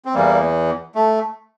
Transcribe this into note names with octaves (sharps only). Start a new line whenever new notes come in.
C4
E2 E3 G3 A#3
A3